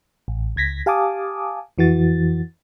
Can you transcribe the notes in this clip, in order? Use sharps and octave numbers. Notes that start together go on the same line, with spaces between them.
A1
C#2 G#6 A#6 B6
G4 F5 G#5 A5 D6 D#6
F2 E3 F#4 A6